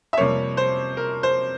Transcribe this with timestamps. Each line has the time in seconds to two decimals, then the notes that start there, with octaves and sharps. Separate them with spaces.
0.13 E5
0.17 F2 C3 G3 A#3 C#5
0.57 C5
0.97 A#4
1.23 C5